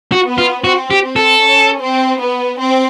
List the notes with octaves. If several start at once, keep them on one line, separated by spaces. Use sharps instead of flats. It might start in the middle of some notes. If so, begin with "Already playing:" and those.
F#4
B3
F4
C4 F#4
G4
C4
A4
C#4
C4
B3
C4